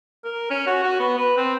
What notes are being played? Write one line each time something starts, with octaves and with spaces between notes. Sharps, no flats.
A#4
C#4
F#4
F#4
B3
B4
C4